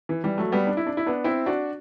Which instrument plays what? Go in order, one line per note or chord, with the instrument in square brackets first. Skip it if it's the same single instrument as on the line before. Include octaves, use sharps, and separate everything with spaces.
[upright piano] E3
E3 G3
F#3 A3
G3 B3
D4
E4
D4
E4
B3 D4
C4 E4
D4 F#4